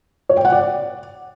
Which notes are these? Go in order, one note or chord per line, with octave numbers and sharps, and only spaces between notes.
C#5
G5
F#5
D5